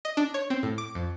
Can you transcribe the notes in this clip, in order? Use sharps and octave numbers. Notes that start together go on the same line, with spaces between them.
D#5
D4
C#5
C4
A2
D6
F2